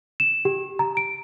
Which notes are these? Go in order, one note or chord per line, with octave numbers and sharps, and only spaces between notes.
E7
G4
A#5
D7